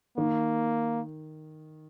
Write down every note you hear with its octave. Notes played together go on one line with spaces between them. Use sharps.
D#3 A#3